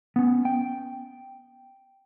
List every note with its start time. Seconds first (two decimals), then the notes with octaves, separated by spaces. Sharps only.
0.16 B3 C#4
0.45 G5